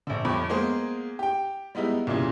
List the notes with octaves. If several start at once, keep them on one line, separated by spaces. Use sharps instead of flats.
A#1 D3
G1 F2 B5 D6
G#3 A#3 B3 G#4 C5
G4 G5
G3 G#3 B3 D#4 E4
C2 A#2 C#3 E3